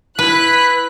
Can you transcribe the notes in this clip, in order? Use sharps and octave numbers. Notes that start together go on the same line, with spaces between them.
E4 B4 F#6 B6